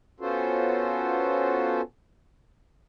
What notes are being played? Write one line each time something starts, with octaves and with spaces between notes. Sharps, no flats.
B3 C#4 F4 F#4 A4 C5